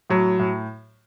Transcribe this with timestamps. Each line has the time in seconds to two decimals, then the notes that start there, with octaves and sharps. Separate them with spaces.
0.10 A2 F#3
0.39 A2